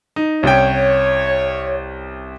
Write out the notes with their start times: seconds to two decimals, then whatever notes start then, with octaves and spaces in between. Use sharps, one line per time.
0.16 D#4
0.43 C2 C#4 C#5 G5